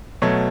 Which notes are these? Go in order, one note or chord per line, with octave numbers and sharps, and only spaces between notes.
B2 F#3 A3 C#5